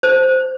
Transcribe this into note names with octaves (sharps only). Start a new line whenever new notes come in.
C5